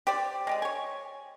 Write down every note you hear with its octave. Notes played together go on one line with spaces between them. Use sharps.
G4 C5 D5
G#3 G4 G#4
C#5 G#5